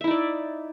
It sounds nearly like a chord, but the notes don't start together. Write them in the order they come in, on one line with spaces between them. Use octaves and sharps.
E5 E4 D#4 D5